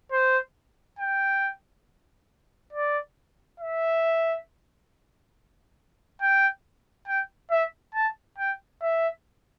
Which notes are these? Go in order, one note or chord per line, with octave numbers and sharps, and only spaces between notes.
C5
G5
D5
E5
G5
G5
E5
A5
G5
E5